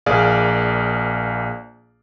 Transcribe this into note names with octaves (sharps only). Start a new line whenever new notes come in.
A#1 A#3 G#4 D5 F5